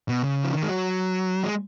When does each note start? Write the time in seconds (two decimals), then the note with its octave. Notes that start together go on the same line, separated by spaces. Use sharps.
0.09 B2
0.24 C#3
0.44 F3
0.53 D#3
0.62 G#3
0.69 F#3
1.43 G#3